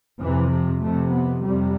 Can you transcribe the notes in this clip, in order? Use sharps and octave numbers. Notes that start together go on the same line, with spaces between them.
F2 C3 E3
F3
F2 C3 A3
B3
F2 C3 G3